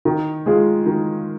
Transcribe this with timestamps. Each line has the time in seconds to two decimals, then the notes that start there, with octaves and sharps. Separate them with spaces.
0.05 D#3
0.46 G#3 F4 G#4
0.86 D#3